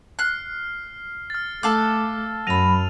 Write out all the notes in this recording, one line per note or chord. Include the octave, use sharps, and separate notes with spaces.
F6 F#6 C7
F6 A6
A3 A4 F5 D6 F#6
F#2 F#3 B5 D#7 F7